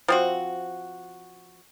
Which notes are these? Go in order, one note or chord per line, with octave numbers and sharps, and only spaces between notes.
F3 C4 F#4